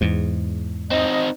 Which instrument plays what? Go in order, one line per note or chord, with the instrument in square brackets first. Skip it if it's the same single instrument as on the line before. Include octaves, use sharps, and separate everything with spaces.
[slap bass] E2 G#2
[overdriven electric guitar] C4 D#4 [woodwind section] D#5